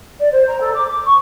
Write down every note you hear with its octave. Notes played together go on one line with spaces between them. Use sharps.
D5
C5
A#5
A4
D6
D6
C#6